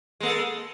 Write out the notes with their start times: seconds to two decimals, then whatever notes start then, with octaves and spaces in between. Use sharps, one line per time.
0.20 G#3
0.23 A#3
0.26 A4